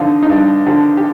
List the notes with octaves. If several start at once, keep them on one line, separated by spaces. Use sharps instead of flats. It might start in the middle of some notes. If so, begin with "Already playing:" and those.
Already playing: G2 D3 F3 D#4 F4
D#4
G2 F4
D3 F3 G4
G4